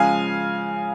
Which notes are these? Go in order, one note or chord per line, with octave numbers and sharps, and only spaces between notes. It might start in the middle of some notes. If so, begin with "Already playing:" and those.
Already playing: C#3 F3 G#3 F5 G#5